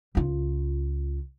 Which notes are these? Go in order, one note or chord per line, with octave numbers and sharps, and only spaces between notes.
C#2 F4